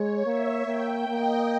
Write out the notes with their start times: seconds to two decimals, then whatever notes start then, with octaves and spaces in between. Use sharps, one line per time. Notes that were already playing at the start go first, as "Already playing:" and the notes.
Already playing: G#3 C#5
0.26 A#3 E5
0.66 A#3 G5
1.08 A#3 D#5